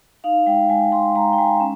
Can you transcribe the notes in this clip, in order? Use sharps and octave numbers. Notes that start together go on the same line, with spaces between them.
D#4 F5
G#3 G5
G#3 G#5
G#3 C6
G#3 A#5
G5
G#3 G#5
C#4